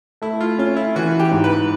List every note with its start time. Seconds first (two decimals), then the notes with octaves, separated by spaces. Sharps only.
0.22 A3 E4
0.40 F4
0.58 C#4 F4
0.76 E4
0.96 E3 F#4
1.19 G4
1.31 G#2
1.44 B4